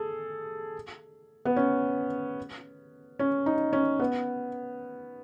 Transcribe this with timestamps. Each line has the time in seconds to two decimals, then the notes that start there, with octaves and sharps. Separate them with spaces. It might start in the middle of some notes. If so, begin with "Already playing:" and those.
Already playing: G#4 A4
1.45 B3
1.56 C#4
3.19 C#4
3.46 D#4
3.73 C#4
3.99 B3